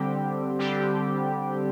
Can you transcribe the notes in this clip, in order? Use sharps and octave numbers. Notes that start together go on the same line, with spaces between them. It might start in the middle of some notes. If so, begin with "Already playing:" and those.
Already playing: D3 G3 C4 G4
D3 G3 C4 G4